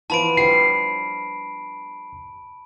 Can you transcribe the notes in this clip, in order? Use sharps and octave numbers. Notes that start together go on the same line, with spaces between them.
E3 F3 B3 A5 B5 D7
F3 G3 D4 C7